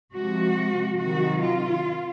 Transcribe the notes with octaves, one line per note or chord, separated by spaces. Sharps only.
C3 F3 G#3 F#4
C3 D#3 F#3 F#4
F4